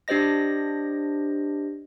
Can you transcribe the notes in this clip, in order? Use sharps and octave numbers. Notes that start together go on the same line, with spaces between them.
D4 G4 C5 D#5 A#6